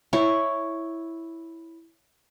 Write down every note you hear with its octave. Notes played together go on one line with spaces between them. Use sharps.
E4 C#5